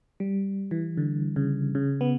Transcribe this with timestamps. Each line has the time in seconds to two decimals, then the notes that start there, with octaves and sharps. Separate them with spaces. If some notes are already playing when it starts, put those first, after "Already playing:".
0.20 G3
0.71 E3
0.97 D3
1.36 C#3
1.75 C#3
2.01 B3